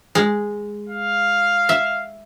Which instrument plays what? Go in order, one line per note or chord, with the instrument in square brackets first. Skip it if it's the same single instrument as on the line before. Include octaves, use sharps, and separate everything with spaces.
[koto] G#3
[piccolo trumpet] F5
[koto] E5